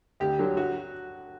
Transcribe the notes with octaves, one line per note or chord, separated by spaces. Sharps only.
D2 G4
D3 F#3
F#4